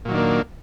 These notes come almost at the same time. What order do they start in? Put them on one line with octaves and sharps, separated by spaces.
A#2 F#3 D#3 D4 A#3